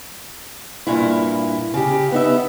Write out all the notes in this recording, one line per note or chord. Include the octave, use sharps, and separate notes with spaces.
G2 A#2 E4
C#3 G4
B3 D#4 E5